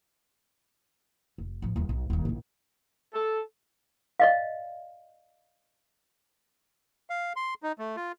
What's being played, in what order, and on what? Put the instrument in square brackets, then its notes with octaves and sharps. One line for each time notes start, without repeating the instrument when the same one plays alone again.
[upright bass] F1
A1 F3
D#1 E2
B1
D#1 D#2
A#1 E4
[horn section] A4
[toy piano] D5 D#5 F5
[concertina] F5
C6
D#4
A3
F4